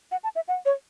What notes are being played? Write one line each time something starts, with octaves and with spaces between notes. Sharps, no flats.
F#5
A5
E5
F#5
C#5